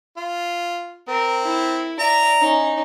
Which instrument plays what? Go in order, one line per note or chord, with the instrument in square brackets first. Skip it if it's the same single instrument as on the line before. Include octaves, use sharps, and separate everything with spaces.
[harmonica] F4
[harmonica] C4 [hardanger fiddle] A#4
[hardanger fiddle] E4
[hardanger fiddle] D5 E5 [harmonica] A#5
[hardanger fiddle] C#4 D#4